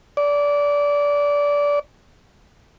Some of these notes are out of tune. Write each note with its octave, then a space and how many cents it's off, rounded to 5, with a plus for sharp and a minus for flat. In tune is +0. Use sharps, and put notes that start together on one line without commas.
D5 -20